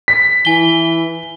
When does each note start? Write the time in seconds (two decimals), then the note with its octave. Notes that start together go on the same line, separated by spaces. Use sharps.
0.08 B6
0.45 E3 G#5 G7